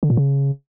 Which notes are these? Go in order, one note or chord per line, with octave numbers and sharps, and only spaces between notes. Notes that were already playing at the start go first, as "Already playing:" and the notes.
D3
A#2
C#3